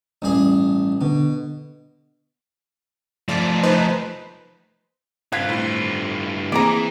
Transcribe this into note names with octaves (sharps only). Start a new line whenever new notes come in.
A1 G2 G#4
B2 D3
F3 A3 D5
D#4 B4 C5
G2 C4 F4 F5 F#6 G#6 B6
A2
E3 A#3 C4 G#4 D5 A#5